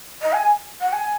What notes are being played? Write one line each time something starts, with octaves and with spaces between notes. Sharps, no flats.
D#5
G#5
F#5
G#5